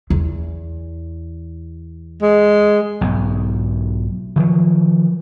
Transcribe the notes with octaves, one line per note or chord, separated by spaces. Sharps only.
E2
G#3
B1 G#2
D#3 F3 F#3